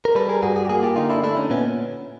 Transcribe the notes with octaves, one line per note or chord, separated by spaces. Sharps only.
A#4
G3 A4 B4
G#4 A#4
G2 F#4 G#4
F#4 G#4
G4
A#3 F#4 G#4
F4 G4
D3 D#4 F4
D4 E4
A3 D4 E4
C#4 D#4
A#2 B3 C#4